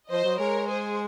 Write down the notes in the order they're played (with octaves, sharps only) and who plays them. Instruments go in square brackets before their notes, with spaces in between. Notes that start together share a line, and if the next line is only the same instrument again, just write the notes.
[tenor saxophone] F3 [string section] C5 D#5
[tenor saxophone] F#3
[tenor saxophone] G#3 [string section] A#4 C#5
[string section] G#4 C5